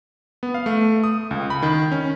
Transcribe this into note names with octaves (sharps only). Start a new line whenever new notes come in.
B3
F5
A3
D#6
C#2
B5
D#3
C#4